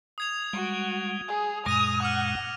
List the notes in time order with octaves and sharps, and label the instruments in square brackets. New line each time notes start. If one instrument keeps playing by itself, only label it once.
[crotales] D#6 G#6 F7
[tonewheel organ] G3 G#3 [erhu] F#4
[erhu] G#4
[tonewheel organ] F#2 A#2 G#3 [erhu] D#6 [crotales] A#6 D#7 F7
[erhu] F#5 [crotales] D6 F6